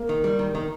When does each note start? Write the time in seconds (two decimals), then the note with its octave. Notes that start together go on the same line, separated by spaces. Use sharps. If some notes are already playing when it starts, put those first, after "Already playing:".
Already playing: A#3
0.09 D#3
0.24 G3
0.39 D#3
0.55 D#3